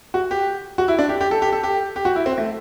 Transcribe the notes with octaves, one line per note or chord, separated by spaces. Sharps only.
F#4
G4
F#4
E4
D4
G4
G4
A4
G4
A4
G4
G4
F#4
E4
C4
A3